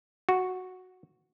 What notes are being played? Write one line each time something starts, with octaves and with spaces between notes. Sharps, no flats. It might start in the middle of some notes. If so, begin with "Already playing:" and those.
F#4